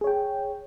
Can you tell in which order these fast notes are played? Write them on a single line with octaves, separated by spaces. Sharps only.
G#4 C#5 G5